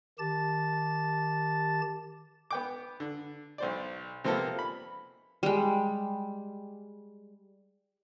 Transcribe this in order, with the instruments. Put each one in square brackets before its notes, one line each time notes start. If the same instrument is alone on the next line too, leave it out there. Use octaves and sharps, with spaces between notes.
[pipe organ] D#3 G4 A5 A6
[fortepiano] B3 G5 D6
D3
B1 C5 D5
C3 F3 A#3 B3 A4
B5
[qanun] G3 G#3